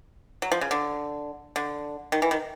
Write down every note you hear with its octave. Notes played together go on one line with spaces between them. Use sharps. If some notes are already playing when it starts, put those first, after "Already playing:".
F#3
F3
C#3
D3
D3
D#3
E3
D#3